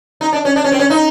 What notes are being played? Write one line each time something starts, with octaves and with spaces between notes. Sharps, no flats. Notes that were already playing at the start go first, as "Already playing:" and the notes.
D#4
D4
C#4
D4
C#4
C4
C#4
D#4